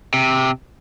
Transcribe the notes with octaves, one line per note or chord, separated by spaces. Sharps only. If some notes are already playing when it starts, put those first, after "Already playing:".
C3